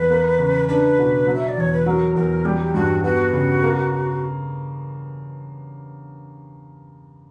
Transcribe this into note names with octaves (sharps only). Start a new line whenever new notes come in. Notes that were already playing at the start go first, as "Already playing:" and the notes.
Already playing: E2 B4
A#3
C#3
D4 B4
B2
F#3
E5
D5
E2 C#5
B4
F#3 A#4 B4
E2 A#4
G3 G4
G2 F#4
B3 F#4
C#3
A#3